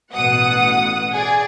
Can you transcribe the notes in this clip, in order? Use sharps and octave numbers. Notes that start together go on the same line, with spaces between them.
A1 B2 F#5 D#6
G#4 D5